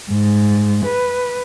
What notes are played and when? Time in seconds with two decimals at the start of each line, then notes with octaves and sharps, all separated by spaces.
0.10 G#2
0.84 B4